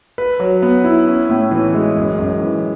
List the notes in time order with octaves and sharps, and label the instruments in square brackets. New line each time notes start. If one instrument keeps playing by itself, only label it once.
[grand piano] B4
F#3
B3
E4
C#4
A2
E3
G#3
F#2
F#2
E3